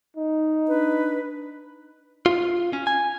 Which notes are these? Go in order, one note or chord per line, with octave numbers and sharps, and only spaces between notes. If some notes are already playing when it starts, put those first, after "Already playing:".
D#4
D4 B4
F4
C#4
G#5